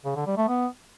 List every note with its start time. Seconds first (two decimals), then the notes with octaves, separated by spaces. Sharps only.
0.05 C#3
0.16 D3
0.27 G3
0.37 A3
0.48 B3